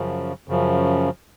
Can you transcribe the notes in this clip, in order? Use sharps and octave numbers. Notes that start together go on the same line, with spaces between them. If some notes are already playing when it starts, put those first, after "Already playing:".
Already playing: F#2 C#3 F3
F#2 C#3 F3